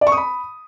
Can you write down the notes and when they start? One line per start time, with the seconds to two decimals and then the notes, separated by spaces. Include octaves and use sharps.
0.01 D5
0.07 C#6
0.12 D#6
0.17 B5